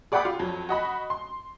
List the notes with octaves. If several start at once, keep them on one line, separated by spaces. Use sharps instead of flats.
G#4 D5 F#5 G5 B5 D6
F4
F2 F#3
F#4 D#5 B5
C6